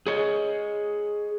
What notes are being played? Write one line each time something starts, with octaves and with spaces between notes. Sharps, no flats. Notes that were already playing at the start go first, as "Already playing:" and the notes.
G#4 C#5 D#5